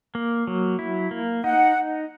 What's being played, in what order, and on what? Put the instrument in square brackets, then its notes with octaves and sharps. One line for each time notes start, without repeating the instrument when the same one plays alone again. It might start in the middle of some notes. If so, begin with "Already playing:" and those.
[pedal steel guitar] A#3
F#3
E4
A#3
[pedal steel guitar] D#4 [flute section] F#5